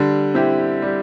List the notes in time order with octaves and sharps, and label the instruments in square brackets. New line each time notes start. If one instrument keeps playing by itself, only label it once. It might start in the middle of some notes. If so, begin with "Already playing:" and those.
Already playing: [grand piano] D3 [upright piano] G3
[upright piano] C4 E4 G4
G3